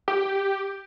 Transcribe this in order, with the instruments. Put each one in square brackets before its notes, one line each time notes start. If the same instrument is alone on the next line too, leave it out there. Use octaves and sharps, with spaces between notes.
[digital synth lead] G4